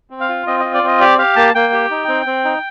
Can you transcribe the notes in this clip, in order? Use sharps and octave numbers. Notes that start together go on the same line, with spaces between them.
C4
F5
F4
C4 D#5
D#5
F4
D5
C4 D#5
G4 D5
G4 F5
A#3 A5
A#3 G5
G4
D#4
C4
C4
D#4